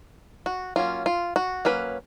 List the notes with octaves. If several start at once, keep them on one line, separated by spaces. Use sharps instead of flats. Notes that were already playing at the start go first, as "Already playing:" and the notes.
F#4
F#3 A#3 C#4 F4
F4
F#4
F#3 A#3 C#4 B4